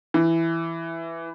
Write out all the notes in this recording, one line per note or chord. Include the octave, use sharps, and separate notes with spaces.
E3